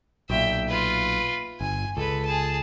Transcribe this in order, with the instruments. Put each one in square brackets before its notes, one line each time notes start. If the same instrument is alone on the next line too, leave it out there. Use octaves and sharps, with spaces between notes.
[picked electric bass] B1 A#2 [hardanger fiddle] E5 G5
[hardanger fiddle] F4 B4
[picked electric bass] G1 [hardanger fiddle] G#5
[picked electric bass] C#2 [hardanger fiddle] A4 B4
[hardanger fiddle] G#4 A5